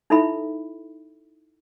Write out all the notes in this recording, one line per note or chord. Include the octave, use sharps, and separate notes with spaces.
D#4 E4 A4 E5 B5